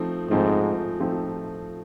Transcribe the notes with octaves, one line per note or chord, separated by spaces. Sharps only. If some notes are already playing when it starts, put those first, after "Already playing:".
Already playing: F3 A3 C4 D#4
G#2 F3 A3 C4 D#4
F3 A3 C4 D#4